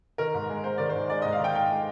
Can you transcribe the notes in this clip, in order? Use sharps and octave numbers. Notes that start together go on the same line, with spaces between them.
D#3 A#4
G#2
G#3
G#2 C5
D#3 D5
C5
G#2
G#3 D5
D#5
G#2
F5
D#3 G5
G#2 G5
G#3